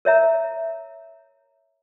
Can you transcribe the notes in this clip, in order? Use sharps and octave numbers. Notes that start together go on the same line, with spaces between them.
A#4 C#5 E5 A#5